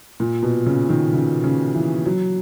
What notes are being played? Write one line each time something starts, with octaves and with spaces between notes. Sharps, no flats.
A#2
B2
C#3
D#3
C#3
C#3
E3
F#3